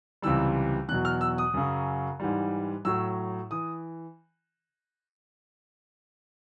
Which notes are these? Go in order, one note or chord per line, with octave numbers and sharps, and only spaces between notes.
C#2 C3 E3 G3 E6
E2 B2 F#3 F#6
F6
E6
D#6
F#2 C#3 F#3
G#2 E3 G3
A2 F#3 E6
E3 D#6